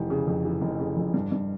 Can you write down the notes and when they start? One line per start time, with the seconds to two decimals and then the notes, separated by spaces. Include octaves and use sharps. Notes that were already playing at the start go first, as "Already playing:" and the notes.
Already playing: F1 E3
0.10 C#3
0.27 F2
0.45 E3
0.61 F1
0.79 C#3
0.96 F2
1.14 G2
1.32 G2